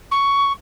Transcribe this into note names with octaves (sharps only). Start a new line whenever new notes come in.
C#6